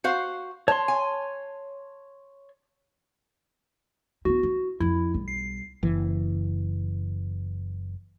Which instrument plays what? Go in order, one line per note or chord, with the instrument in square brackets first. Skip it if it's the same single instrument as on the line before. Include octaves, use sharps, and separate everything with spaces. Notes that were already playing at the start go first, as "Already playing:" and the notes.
[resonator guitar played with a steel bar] F#4 C5 F5
[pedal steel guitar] C#5 C6 [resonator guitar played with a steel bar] A5
[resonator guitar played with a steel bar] G#5
[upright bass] B3 E4 [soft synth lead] F#4
[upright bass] E4
[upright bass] F2 [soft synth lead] E4
[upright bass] B1 G3
[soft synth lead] C7
[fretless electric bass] F#1 E3